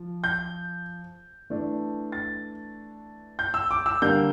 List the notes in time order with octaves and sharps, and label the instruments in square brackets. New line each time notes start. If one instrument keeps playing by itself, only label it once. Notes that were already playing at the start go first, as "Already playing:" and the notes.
Already playing: [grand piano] F3
G6
E3 A3 D4
A6
G6
E6
D6
E6
D3 G3 A#3 G6